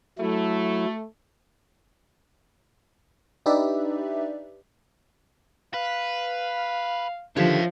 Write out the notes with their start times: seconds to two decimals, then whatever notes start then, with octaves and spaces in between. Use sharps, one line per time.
0.19 F#3 A3 E4
3.46 D4 D#4 G4 B4 D5 E5
5.74 B4 F5
7.37 D3 D#3 F3 G4 C#5 E5